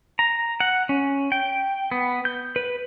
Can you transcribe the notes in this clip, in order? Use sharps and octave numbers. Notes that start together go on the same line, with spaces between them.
A#5
F#5
C#4
G5
B3
G6
B4